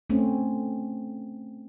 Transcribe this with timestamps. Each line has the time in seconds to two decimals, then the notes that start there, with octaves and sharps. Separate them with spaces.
0.10 A3 C4 C#4